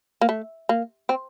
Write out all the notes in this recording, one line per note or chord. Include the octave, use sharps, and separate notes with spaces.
A#3
A3
A#3
C4